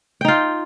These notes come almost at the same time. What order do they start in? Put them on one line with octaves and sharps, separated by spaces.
G5 D#4 F4